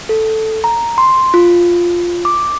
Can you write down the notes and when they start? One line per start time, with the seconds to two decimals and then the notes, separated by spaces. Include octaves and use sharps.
0.09 A4
0.64 A#5
0.98 C6
1.34 F4
2.25 D6